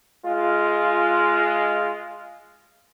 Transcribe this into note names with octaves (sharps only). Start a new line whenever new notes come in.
G#3 F4